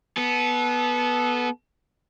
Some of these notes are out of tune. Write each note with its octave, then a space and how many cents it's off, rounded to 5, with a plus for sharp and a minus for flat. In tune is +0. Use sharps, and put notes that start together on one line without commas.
B3 -10 A4 -30